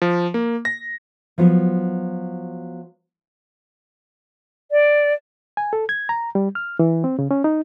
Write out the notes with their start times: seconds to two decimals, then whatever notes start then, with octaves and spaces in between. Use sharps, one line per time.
0.02 F3
0.34 A#3
0.65 A#6
1.38 F3 F#3 B3
4.71 D5
5.57 G#5
5.73 A4
5.89 G#6
6.09 A#5
6.35 G3
6.55 F6
6.79 E3
7.04 C4
7.19 C#3
7.31 C#4
7.44 D#4